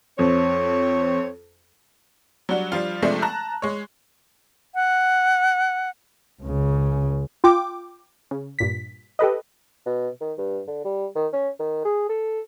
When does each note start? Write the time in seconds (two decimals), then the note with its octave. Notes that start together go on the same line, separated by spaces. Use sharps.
0.19 F2 C4 C#5
2.49 F#3 G3 D4 F#4
2.72 F3 G3 D4 F4
3.02 C3 F3 G#3 A3 D4
3.22 A5 A#5 F#6
3.62 G#3 C#5
4.75 F#5
6.42 C#2 C#3
7.44 F4 G5 D6
8.31 C#3
8.59 G2 A#2 B6
9.19 G4 A4 B4 D#5
9.86 B2
10.21 D#3
10.38 G2
10.67 D3
10.85 G3
11.16 D#3
11.33 C#4
11.59 D#3
11.85 G#4
12.09 A4